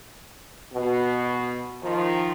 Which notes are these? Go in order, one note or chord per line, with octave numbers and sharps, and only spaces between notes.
B2
D#3 F3